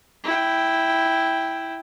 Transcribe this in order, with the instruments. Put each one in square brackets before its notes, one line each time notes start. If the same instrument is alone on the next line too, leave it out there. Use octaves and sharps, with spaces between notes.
[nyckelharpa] E4 G5